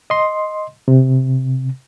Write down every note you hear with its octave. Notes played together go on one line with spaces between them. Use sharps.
D#5 C6
C3